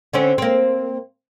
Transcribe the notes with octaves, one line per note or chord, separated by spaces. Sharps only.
D3 C4 C#4
A#3 C4